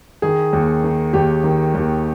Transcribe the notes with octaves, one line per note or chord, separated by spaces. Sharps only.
D#3 G#4
D#2
D#3
D#2 G4
D#3
D#2